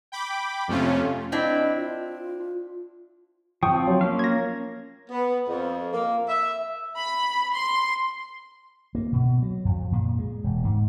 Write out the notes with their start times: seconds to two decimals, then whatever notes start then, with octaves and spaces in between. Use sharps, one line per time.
0.12 G5 B5 D6
0.68 F2 C3 A3 C#4 F4
1.32 C4 D4 E4 D#5
1.77 F4
3.63 F3 C4 G5 C#6 D#6
3.88 F#3
4.01 A#3 C#4 F5
4.19 G#6 A#6
5.10 B3
5.48 F2
5.93 A#3
6.28 E5
6.97 B5
7.54 C6
8.95 A#3
9.12 B2
9.42 F#3
9.65 F2
9.92 A#2
10.19 G#3
10.44 E1
10.64 G#2